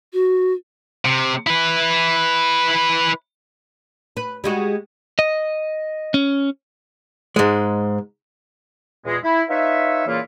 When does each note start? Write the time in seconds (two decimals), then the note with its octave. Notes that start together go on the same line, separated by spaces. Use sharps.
0.13 F#4
1.05 C3
1.47 E4 B4
4.17 B4
4.44 G3 G#3 F#4
5.19 D#5
6.14 C#4
7.36 G#2 G#3
9.05 E2 A#2 G#3
9.23 E4
9.50 D#4 F4 B4 C#5 E5
10.07 A#2 C#3 E3 A#3 E4 F4